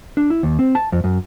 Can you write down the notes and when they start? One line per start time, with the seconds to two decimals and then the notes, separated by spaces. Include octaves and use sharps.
0.17 D4
0.30 E4
0.43 D#2
0.59 C4
0.75 A5
0.92 F2
1.04 F#2